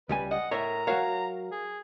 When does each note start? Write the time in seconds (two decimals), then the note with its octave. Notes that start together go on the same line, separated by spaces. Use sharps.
0.09 C#2 G3 B4 G#5
0.31 D#5 F#5
0.51 A2 A#4 C#5 E5 A#5
0.87 F#3 F#4 A#4 C#5 F5
1.52 G#4